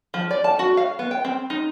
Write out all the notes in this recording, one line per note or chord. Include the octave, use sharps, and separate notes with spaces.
F3
D5
A5
F#4
F5
B3
G5
C4
D#4